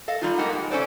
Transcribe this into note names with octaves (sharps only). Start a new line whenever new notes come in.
A4 D#5 F5
G3 D#4 F4
G#3 A#3 D#4 G4 F#5
B2 G#3
C3 C#4 A4 C5 D5